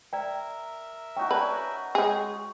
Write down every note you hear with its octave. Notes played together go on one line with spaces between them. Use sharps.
A#4 D5 E5 G5
C#4 D#4 F#4 G5
F#4 B4 D5 G#5 A5
G#3 G#4 C#5 G5